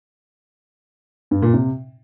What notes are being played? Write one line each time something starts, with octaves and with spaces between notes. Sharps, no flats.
G2
A#2
C3